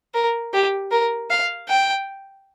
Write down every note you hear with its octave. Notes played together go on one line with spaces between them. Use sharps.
A#4
G4
A#4
F5
G5